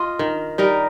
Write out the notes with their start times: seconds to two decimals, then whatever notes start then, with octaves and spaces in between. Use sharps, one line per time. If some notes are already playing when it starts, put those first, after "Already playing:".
Already playing: F4 D#5
0.19 D#3
0.58 G3 D#4 A#4